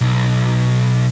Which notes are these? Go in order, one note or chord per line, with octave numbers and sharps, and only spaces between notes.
B1